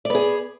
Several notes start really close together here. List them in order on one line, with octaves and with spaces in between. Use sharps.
D5 B3 G#4